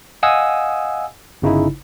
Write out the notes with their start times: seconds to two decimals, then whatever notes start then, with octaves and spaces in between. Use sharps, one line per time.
0.23 D#5 F5 F#5 G#5 D#6 E6
1.42 G1 C#3 D#4 E4